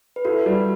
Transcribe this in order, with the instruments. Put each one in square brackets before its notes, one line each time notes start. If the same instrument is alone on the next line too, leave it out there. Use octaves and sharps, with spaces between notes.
[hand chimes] B4
[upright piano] E4 [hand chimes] F#4 A4
[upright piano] G3